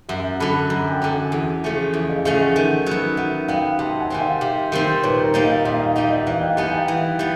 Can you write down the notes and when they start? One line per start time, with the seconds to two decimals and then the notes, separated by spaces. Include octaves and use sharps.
0.09 F#2 E5 F#5
0.39 D3 F#3 A5 B5
0.70 F#2 G#5 A#5
0.91 G5 A5
1.02 D3 F#3
1.12 F#5 G#5
1.32 E2
1.64 C#3 F3 A3 C#4
1.94 E2
2.09 D#5 F5
2.25 C#3 F3 A3 C#4 D#5 F5
2.40 E5 F#5
2.56 D#3
2.86 F#3 B3
3.17 D#3 E5 F#5
3.48 F#3 B3 F5 G5
3.79 C3 G5 A5
4.00 F#5 G#5
4.10 D#3 G3 C4
4.21 F5 G5
4.41 C3
4.72 D#3 G3 C4
5.02 A#2 B4 C#5
5.23 A#4 C5
5.34 G3 A#3 D#4
5.44 D#5 F5
5.65 A#2 D#5 F5
5.80 D#5 F5
5.96 G3 A#3 D#4 D#5 F5
6.10 D5 E5
6.26 E3 D#5 F5
6.41 F5 G5
6.57 G3 B3 D#4 F#5 G#5
6.73 F5 G5
6.88 E3
7.19 G3 B3